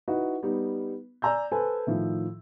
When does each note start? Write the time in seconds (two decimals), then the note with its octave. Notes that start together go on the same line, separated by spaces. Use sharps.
0.08 D#4 E4 F#4 B4 D#5
0.43 G3 B3 D#4
1.22 D5 G#5 A#5 E6 G6
1.52 A4 B4 C5 G#5
1.87 A2 D#3 F3